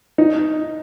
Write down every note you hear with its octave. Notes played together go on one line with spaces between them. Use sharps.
D#4